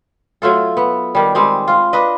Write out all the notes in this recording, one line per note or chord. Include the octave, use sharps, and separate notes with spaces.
F#3 A3 F4 A4
B3
D#3 G3
G3 G#3 C4
F4
D4 B4 D#5